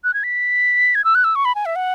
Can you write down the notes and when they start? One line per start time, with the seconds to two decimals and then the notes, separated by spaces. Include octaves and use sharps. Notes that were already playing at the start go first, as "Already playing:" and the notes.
0.04 F#6
0.14 G#6
0.24 B6
0.95 G#6
1.04 E6
1.15 F#6
1.24 E6
1.35 C#6
1.45 B5
1.55 G#5
1.66 E5
1.76 F#5